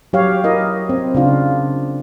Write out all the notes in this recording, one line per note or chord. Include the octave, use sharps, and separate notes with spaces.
F#3 G4 C#5 F5
E4 A#4 D#5
C4
C#3 D4 F4